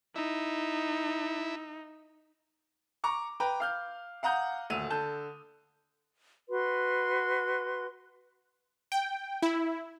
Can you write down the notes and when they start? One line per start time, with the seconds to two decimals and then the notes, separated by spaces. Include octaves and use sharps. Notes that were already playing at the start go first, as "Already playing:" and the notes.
0.16 D#4 E4
3.04 A#5 C#6 D6
3.40 B4 G5 A#5
3.60 F5 F6 G6
4.23 F5 F#5 A#5 D#6 G6
4.70 D#1 D2 E6 D#7 F7
4.90 D3 A5 G6
6.49 F#4 B4 C6
8.92 G5
9.42 E4